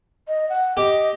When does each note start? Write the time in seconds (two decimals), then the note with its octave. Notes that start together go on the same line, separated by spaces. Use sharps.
0.28 D#5
0.49 F#5
0.77 G4 D#5